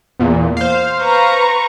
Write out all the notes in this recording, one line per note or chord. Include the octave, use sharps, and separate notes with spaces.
E2 A#2
C5 F5
B4 A#5 C#6